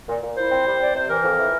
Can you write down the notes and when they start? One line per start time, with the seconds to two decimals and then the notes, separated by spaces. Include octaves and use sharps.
0.09 A#2
0.23 A#2
0.37 E4 C5
0.51 C4
0.67 G3
0.80 C4 D5
0.95 C3 C5
1.09 E3 A#4
1.24 F2
1.38 E3